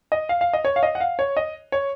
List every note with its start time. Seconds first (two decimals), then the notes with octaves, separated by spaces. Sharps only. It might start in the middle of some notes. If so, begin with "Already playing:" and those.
0.12 D#5
0.29 F5
0.41 F5
0.53 D#5
0.65 C#5
0.76 F5
0.83 D#5
0.95 F#5
1.00 F5
1.19 C#5
1.37 D#5
1.72 C#5